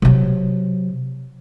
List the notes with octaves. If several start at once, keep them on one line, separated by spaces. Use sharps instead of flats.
C3 F#3